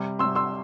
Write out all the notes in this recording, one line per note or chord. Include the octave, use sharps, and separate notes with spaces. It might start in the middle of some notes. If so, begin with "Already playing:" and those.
Already playing: C3 G3
C3 G3 C6 E6
C6 E6